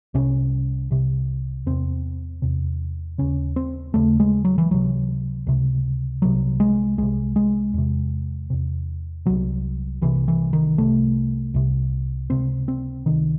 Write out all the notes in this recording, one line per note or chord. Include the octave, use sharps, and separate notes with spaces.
C2 C3 C#4
C2 C3
E2 C3 C4
E2 C3
D#2 C#3 C#4
C4
D#2 C#3 A3
G#3
F#3
E3
C#2 C3 F#3
C#2 C3
C2 C3 F#3
G#3
C2 C3 G#3
G#3
E2 C3
E2 C3
C2 C3 F#3
C2 C3 E3
E3
D#3
C2 C3 A3
C2 C3
C#2 C3 C4
C4
C#2 C3 D#3